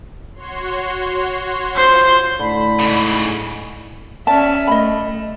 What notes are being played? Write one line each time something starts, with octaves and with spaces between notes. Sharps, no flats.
F#4 C#5 C6
F4 C5
A2 D3 B5
G#2 C#3
C#4 D5 E5 A5
A3 D#5 B5